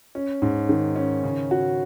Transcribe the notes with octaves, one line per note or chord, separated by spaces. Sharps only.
C#4
G#2
D#3
C#4
C#3
F#4